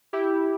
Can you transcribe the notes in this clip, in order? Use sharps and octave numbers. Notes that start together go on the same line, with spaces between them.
E4 G4